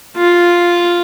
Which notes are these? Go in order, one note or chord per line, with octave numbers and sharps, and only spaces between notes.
F4